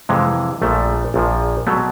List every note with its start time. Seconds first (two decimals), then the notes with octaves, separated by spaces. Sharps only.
0.09 F2 C3 E3 G#3
0.62 A#1 A#2 F3 A3
1.14 A#1 A#2 F3
1.67 B2 F#3 A3